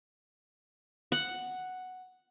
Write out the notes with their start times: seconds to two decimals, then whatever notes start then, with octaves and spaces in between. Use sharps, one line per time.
1.12 F#5